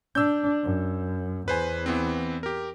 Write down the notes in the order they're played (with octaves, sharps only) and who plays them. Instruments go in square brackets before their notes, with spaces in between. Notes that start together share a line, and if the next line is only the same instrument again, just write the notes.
[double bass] D4 [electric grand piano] E6 G6
[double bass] F#2
[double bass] E2 [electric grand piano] B4 C5 G#5
[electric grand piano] E3 B3 C4
G4 A#4